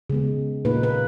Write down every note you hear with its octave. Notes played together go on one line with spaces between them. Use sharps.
C#3 G#3 B3
A#2 A#3 D#4 B4
B4